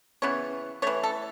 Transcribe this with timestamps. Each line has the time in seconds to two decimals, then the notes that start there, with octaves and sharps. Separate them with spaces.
0.22 C#3 E3 B3 C#5
0.82 E3 A3 C#5
1.03 A4